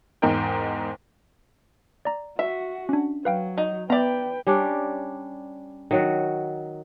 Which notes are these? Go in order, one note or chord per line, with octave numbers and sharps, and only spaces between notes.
E2 G#2 D#4 A#4 G5
D5 A#5
F#4 E5
C#4 D4
F#3 B4 F5 G5
D#4
B3 B4 D5 E5 G5 A#5
G3 C#4 D4
D#3 F#3 F#4